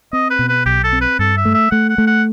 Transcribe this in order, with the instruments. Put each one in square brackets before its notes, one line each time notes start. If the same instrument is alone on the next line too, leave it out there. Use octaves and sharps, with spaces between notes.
[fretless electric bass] C4 [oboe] D#5
[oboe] B4
[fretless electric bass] B2
[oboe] B4
[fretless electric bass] B1 [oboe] G4
[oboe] A4
[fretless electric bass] C4
[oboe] B4
[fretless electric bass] G2 [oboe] A4
[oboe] E5
[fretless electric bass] A3
[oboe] E5
[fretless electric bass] A3 [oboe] F#5
[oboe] F#5
[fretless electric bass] A3
[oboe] F#5